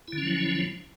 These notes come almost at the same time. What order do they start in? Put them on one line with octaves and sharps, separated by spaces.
E4 D3 C#4 F3 F#3